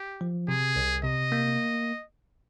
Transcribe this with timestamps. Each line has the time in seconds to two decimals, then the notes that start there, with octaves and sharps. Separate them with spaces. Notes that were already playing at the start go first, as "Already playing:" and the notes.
Already playing: G4
0.21 F3
0.48 C3 G#4
0.76 C2
1.04 C3 D#5
1.32 A#3